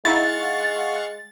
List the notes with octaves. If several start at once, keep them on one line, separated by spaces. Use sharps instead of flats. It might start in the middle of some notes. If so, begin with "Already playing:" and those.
G#3 D#4 E4 F5 F#5 C#6 A6